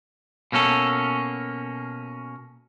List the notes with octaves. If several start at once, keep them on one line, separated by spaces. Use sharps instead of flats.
B2 A#3 C#4 A4